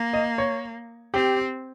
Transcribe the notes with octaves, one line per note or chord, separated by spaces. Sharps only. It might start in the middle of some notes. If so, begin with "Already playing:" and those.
Already playing: A#3
D#5
C#5
C4 G4